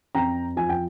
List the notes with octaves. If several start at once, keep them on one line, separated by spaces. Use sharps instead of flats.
F2 G5 A#5
F3 G#5
G5